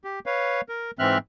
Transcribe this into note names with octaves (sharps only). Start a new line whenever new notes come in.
G4
B4 C#5 F5
A#4
G#2 E3 C4 E5 F6 F#6